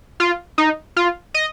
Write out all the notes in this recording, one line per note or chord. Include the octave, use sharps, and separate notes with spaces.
F4
D#4
F4
D#5